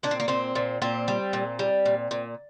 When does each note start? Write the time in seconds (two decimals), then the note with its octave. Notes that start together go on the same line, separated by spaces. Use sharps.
0.03 A#2 D4
0.11 C4
0.20 A#3
0.28 A#2 C4
0.55 A#2
0.82 A#2 C4
1.08 G3
1.33 A#2
1.59 G3
1.86 A#2
2.11 A#2